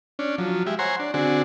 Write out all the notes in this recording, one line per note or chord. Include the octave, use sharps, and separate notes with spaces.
C#4 D4
F3 F#3
G#3 G4 E5
C5 C#5 F#5 G#5 A#5 C6
D4
D3 C4 D4 F#4 G#4